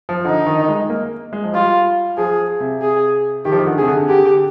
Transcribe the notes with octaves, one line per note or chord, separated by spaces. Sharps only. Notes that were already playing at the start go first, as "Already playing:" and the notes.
F3
D3 D#4
D#3
G#3
A#3
G#3
F3
G3 F4
F3 G#4
C3
G#4
D#3 G4
F3
D#3
D3
C3 G#4
D3
D3 G4